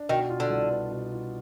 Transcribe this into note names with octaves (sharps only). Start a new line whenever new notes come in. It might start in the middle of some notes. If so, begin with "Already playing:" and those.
Already playing: D4
B2 D#3
F4
D3
C2
B3
B2
F4